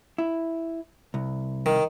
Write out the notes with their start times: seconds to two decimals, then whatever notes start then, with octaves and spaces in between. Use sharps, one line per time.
0.18 E4
1.14 C2
1.66 D#3